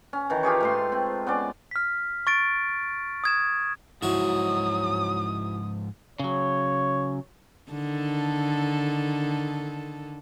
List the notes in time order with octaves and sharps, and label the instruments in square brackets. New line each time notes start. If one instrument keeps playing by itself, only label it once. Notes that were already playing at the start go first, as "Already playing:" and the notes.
[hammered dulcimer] C#4
D#3 E3
F4 G4 G#4 C#5
G#2 A3 C6
C4
B3 C#4 D5
[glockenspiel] F6 B6
C#6 A6 D7
D#6 G#6 E7
[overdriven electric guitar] G#2 F3 [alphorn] F#3 [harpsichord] E4 F#4 [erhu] D#6
[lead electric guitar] C#3 F#3 [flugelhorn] C#5
[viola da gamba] D3 D#3 A4